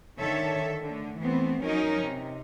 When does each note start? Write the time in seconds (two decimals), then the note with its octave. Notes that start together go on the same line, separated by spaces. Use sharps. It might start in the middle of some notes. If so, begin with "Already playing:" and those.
0.19 D3 D#3 A4 C#5 E5
0.82 D3 A3
1.19 E3 A3 B3 C4
1.64 F#3 C#4 D#4 A#4
2.04 C3